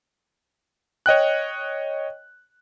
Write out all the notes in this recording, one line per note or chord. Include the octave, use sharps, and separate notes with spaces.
C#5 D#5 G5 F#6